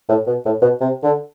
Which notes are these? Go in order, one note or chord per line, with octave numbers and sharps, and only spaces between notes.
A2
B2
A2
B2
C3
D3